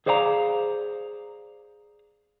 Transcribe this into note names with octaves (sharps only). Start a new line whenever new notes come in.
G#4 C5 D5 F5 A5 A#5